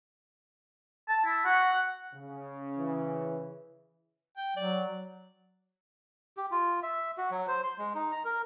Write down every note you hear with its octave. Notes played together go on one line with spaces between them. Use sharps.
A5
E4
F#4 F#5
C#3
E3
G5
F#3 D5
G4
F4
E5
F#4
F#3
C5
C6
G#3
D#4
A#5
A#4